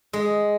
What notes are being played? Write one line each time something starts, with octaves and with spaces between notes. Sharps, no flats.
G#3